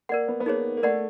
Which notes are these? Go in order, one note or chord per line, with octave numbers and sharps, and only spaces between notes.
A#3 A#4 D5 F#5
B3
B3
A#3 D#4 G#4 C#5
A#3
A3 A#4 D5 F#5